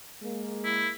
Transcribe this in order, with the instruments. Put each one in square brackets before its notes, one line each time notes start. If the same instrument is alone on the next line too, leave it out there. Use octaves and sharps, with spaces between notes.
[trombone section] G#3 A#3
[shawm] E4